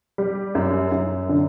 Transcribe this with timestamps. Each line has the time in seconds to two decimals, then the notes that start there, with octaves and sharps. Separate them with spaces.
0.18 G3
0.55 F#2
0.92 F#2
1.29 D3